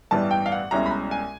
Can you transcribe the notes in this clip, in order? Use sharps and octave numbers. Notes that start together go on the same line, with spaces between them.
A1 G2 E3 G3 B3 A5
G5
F5
F#5
C2 B2 G#3 C#4 E4 A#5
B5
A#5
G#5